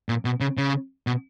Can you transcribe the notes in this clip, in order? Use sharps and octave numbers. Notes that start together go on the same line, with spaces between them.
A#2
B2
C#3
C#3
B2